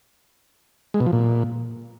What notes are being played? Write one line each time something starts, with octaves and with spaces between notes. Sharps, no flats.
G#3
B2
F3
A#2